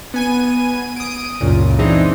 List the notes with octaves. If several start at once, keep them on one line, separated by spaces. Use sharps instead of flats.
B3 G#5 D#7
D#6 D7
C#2 F#2 A#2
E3 G#3 C4 D4 D#4